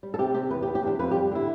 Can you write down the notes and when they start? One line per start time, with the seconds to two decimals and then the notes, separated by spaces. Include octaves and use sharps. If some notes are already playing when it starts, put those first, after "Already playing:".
0.03 G3
0.14 A4
0.18 C3 G4
0.34 C3 G4
0.50 E2 B4
0.63 G4
0.67 B3
0.75 G4
0.83 E2 D4
0.99 F2 B4
1.11 G4
1.15 G3
1.31 D3 E4